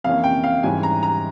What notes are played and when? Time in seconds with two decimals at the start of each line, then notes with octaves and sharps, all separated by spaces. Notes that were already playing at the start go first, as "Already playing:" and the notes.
0.04 F2 C3 E3 A#3 C#4 F5
0.24 G5
0.44 F5
0.63 G#2 E3 G3 C#4 G#5
0.83 A#5
1.03 A#5